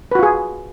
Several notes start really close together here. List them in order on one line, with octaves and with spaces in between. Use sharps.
B4 F#4 F4 G#4